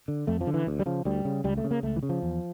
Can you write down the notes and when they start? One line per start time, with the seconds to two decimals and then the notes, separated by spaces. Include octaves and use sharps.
0.08 D3
0.27 F2 A3
0.41 F3
0.47 D3
0.54 E3
0.67 D2
0.80 G3
0.86 C#3 F3
1.05 D2 G3
1.25 C#3
1.44 C#2 G3
1.58 A3
1.64 C#3
1.71 A#3
1.83 C#2 A3
1.96 E3
2.03 C#3
2.09 F3
2.22 E2